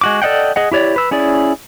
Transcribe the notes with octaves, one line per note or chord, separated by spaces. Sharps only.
G#3 F#4 D6
A4 D5 D#5 F#5 G5
G#4 D#5 F#5
E4 G4 C#5 D5
B4 E6
C#4 E4 G#4 D5